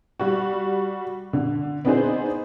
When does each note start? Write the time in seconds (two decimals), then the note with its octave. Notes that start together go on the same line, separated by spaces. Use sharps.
0.20 G3 F#4
1.33 D3
1.85 B3 C4 D4 D#4 G#4 C5